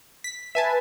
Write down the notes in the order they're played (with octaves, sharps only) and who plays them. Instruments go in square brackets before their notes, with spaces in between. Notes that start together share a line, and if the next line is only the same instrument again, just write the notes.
[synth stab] B6
[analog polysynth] B4 [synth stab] E5 G#5 A5